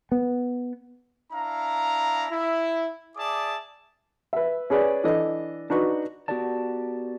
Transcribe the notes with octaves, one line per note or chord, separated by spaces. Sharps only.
B3
D4 E4 F5 A#5
E4
G#4 D5 E5 A5 D6 D#6
B4 E5
C#4 G#4 B4 D5
E3 D4 A4 D#5
D4 D#4 F#4 B4
B3 F#4 G4 A#4 D5 A5